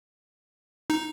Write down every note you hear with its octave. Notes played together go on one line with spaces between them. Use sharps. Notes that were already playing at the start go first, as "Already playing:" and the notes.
D#4